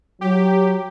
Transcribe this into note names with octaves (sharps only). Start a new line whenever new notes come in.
F#3 G4